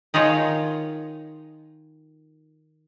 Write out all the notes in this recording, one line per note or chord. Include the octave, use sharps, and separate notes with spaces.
D#3 D#4 F4 G#4 C#5